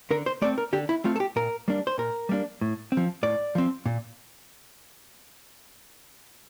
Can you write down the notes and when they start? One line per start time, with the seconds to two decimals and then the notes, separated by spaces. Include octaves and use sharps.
0.11 D3 A#4
0.26 C5
0.42 A3 C4 D5
0.58 A#4
0.73 D3 G4
0.89 E4
1.04 A3 C4 F4
1.16 A4
1.20 G4
1.36 A#2 A#4
1.68 G3 A#3 D4
1.87 C5
1.98 A#2 A#4
2.29 G3 A#3 D4
2.61 A2
2.92 C4
2.97 F3
3.23 A2 D5
3.55 F3 C4
3.86 A#2